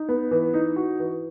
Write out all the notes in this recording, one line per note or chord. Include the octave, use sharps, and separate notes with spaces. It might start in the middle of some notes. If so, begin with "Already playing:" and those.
Already playing: D#4
B3
E3
D#4
F#4
E3